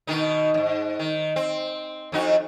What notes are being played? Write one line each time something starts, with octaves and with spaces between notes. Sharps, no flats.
B2 D#3 D#4
D#2 G#2
D#3
C4
F2 D#4 F#4